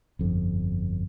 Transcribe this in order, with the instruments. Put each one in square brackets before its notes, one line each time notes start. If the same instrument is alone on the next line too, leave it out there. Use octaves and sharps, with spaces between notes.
[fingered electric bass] G1 F2